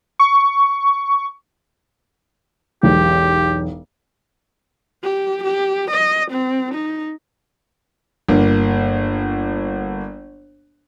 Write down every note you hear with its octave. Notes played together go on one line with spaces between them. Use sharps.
C#6
E1 B1 G4
G4
G4
D#5
C4
D#4
G1 A#3